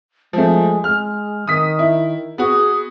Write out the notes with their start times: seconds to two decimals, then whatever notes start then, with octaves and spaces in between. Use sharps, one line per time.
0.33 F3 G#3 A3
0.84 G#3 F6
1.47 D#3 D#6 B6
1.79 E4
2.38 B3 F#4 G#4